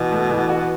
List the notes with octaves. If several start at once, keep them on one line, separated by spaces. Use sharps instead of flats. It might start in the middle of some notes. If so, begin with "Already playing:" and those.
Already playing: B2 E3
A3
E3
F#4